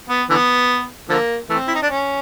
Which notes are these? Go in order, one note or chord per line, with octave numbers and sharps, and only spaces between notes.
B3
D3 E3 B3
D3 F3 A#3
E3 A3 C4
E4
D#4
D4
C#4